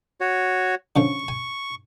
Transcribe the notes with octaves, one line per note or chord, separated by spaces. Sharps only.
F#4 C#5
D3 F3 C#4 C#6
G#5